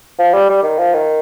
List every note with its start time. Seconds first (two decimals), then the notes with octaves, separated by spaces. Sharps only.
0.19 F3
0.34 G3
0.49 G3
0.63 D#3
0.78 F3
0.94 D#3